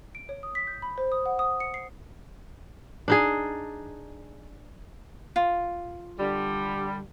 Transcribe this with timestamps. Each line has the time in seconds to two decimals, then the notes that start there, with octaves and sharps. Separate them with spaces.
0.15 D7
0.29 C#5
0.43 D#6
0.55 B6
0.67 G6
0.82 B5
0.98 C5
1.12 D#6
1.26 F#5
1.39 D#6
1.60 C#7
1.74 C7
3.08 D4 D#4 G#4
5.36 F4
6.19 D3 G3